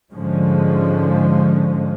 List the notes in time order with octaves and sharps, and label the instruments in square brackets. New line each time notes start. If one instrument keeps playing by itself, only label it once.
[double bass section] G#2 D3 F3 G#3 C#4